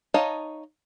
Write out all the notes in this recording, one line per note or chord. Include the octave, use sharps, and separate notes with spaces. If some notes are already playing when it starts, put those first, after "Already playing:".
D#4 C#5 D#5 F5 A5